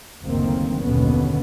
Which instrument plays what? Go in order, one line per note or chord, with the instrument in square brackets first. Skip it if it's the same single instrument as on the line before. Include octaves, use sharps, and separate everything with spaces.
[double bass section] F#1 D2 D#3 A#3 C4
F#1 D#2 B2 D3 B3 C#4